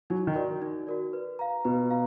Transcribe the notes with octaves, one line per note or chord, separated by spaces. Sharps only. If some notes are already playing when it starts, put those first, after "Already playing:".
F#3 D#4
D#3
F#4 A#4 D5
D#4
F#4 A#4 D5
B4
F5 A#5
B2 B4
F5 A#5